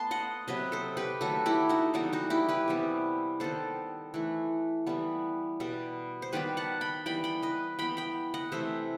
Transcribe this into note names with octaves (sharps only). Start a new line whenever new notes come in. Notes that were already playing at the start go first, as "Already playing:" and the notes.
Already playing: A3 B3 A5 C6
D#5 F#5
C3 F#3 B3 B4 D#5
A4 C5
G4 B4
D#3 F#3 A3 F#4 A4
E4 G4
D#4 F#4
E3 G3 B3 D#4 F#4
D#4 F#4
E4 G4
G4 B4
C3 E3 G3 B3
D#3 G3 B3 A4 C5
E3 A3
E3 G3 B3
B2 G3 B3
C5
D#3 G3 B3 G4 B4
F#5 A5
G5 B5
E3 G3 B3 G5 B5
G5 B5
B4 D#5
E3 B3 G5 B5
G5 B5
D#5 F#5
C3 E3 A3 C5 E5